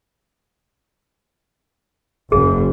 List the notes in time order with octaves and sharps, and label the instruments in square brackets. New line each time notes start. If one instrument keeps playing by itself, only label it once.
[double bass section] F#1 F#2 [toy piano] G#4